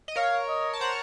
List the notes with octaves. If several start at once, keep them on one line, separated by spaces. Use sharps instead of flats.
D#5
A#4 C#5 F5
D#5
A5
C5 F#5 A#5